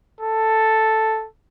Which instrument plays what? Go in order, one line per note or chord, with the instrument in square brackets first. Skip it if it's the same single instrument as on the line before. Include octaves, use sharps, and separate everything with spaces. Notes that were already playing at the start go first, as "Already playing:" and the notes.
[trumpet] A4